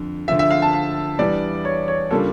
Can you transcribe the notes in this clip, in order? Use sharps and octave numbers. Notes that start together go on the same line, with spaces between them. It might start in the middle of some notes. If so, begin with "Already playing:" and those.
Already playing: F2 D3
D2 D3 F3 E5
E5
F5
A5
F5
E2 E3 G3 D4 D5
C#5
C#5
C#3 G3 A#3 D4 F4 A4